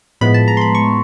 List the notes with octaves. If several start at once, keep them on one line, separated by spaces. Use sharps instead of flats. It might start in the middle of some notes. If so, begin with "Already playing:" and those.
A2 F3 G#3 B3 B5
A5
A#5
C6
B5
C#6